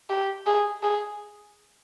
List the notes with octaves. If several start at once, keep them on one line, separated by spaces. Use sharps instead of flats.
G4
G#4
G#4